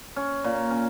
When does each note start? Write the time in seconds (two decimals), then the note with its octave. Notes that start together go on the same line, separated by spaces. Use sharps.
0.16 C#4
0.44 A#2
0.71 C#4